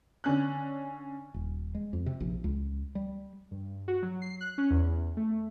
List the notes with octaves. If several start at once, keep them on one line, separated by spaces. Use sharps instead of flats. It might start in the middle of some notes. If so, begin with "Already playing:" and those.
D3 C#4 F#6
D#1
G#3
F2
C3
A#1
C#2
G3
G2
F#4
F#3
C7
F#6
C#4
E2
A3